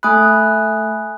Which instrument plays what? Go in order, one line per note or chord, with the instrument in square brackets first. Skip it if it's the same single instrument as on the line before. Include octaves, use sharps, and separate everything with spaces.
[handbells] A3 B5 [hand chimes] G#5 D#6 F#6